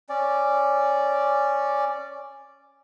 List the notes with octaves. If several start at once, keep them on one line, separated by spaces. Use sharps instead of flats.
C#4 D5